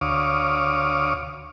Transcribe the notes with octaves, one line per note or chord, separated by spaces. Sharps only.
D2 C#5 F5 D6 D#6